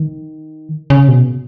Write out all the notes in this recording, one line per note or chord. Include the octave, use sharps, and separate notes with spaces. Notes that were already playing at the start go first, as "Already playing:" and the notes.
Already playing: D#3
C#3
B2